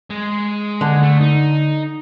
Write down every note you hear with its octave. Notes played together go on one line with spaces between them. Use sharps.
G#3
D3
A3
D#4